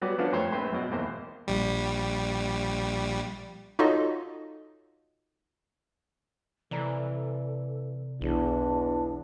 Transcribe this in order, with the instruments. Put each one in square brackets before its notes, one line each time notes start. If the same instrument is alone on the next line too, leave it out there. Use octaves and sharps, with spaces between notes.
[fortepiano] F#3 G3 B3 F#4 G4 D5
F3 B3 C#4 D4 F4 F#4
F2 A3 C5 C#5
A#1 C4 B4 C5
F#2 B2
G#1 E2 A#3 C5
[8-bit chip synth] A#1 G3
[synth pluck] D#4 F4 F#4 A4 C#5 D#5
[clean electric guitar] C3 D5 A#5 [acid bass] E3 [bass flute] A4
[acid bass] B1 [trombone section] E2 [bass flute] D4